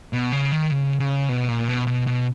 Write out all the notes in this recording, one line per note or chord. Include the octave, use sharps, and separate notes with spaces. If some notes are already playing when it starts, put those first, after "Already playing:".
B2
C#3
D#3
C#3
C#3
B2
A#2
B2
B2
B2